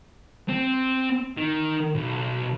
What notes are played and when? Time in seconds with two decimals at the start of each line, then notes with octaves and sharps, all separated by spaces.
0.49 C4
1.37 D#3
1.95 B1